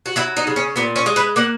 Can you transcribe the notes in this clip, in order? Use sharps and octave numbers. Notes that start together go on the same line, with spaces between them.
F#4
F#3 E4
D#4
C#3
C#4
A#2 B3
C#4
G#3
B4
A#3 F#5